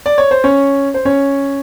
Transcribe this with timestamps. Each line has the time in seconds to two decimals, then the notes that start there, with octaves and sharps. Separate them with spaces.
0.06 D5
0.18 C#5
0.31 C5
0.44 C#4 C#5
0.94 C5
1.05 C#4 C#5